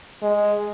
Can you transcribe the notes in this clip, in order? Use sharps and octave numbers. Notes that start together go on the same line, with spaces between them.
G#3